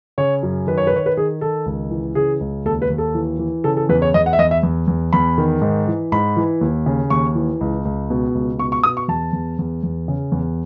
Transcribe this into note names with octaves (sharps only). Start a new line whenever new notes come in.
C#3 C#5
F#2
D#3 B4
C#5
B4
D#3 C#5
B4
D#3 G#4
D#3 A4
C#2
E3
C#3 G#4
C#2
D#2 A4
B4
D#2
A4
E3
E3
C#3 A4
A4
E2 B4
C#5
E2 D#5
F#5
E5
E2 D#5
E5
E2
E2
E2 B5
D#3
G#2
E3
G#2 B5
E3
D#2
C#3
D#2 C#6
E3
C#2
C#2
B2
C#2
B2 C#6
C#6
B2 D#6
C#6
E2 A5
E2
E2
E2
C#3
E2